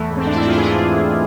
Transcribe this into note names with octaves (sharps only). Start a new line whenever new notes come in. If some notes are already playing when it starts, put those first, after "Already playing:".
Already playing: E2 E3 A3
G#2
C4
G#2 D4
G#2 E4
F4
E3 G#4